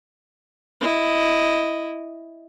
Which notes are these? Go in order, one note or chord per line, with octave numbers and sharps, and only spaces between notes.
E4 D#5